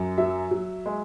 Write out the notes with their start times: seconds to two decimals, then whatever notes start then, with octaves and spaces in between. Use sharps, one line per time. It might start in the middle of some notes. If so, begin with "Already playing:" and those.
Already playing: F#2
0.18 F#3 E5
0.51 F#3
0.86 G#3